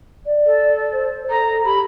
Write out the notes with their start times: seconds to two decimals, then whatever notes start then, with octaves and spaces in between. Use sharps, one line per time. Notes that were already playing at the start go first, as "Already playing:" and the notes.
0.26 D5
0.46 A4
0.92 C5
1.30 A4 A#5
1.65 G4 B5